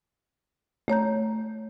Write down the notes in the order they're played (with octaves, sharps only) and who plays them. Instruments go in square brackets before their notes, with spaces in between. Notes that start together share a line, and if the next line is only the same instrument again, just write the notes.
[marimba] A3 C#5 A#5 G6